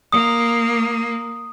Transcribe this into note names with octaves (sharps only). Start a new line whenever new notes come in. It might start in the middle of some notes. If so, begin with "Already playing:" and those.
A#3 D#6